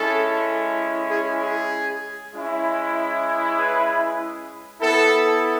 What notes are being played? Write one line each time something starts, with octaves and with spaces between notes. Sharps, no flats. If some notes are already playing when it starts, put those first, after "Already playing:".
Already playing: G#3 C#4 E4 A4
G#4
G#4
G#3 C#4 E4
G#4 B4
B3 E4 A4